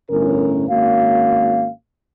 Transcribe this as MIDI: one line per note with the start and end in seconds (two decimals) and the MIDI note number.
0.10 0.67 31
0.10 0.67 45
0.10 0.67 61
0.10 0.67 70
0.70 1.69 32
0.70 1.69 58
0.70 1.69 61
0.70 1.69 66
0.70 1.69 77